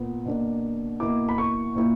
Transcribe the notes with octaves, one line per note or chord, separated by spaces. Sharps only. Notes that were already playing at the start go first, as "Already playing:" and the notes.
Already playing: A#2 B3
B2 A#3 D4
B2 A#3 E4 D6
B5
C#6
A#2 A#3 E4